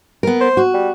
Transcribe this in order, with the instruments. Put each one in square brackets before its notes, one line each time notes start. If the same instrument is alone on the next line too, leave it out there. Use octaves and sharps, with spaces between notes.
[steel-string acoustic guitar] B3 A#4
[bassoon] C5
[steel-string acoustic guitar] F#4
[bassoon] G3